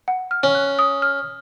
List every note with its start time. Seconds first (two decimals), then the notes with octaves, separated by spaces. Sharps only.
0.08 F#5
0.31 F6
0.43 C#4
0.55 F#6
0.79 D#6
1.02 F6